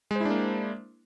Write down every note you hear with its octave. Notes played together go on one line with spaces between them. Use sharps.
G#3 A#3 D4 E4 C5